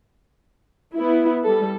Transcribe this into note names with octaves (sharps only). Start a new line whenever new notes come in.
B3 E4
G3 A4